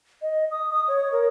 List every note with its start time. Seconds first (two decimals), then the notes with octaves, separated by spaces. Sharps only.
0.22 D#5
0.51 D#6
0.70 D#6
0.88 C#5
1.12 A#4